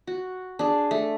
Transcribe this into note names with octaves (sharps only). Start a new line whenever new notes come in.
F#4
D4 G#4
A3